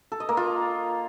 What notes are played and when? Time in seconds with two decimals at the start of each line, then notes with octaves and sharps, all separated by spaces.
0.12 A4
0.20 D#5
0.29 A#3
0.37 F4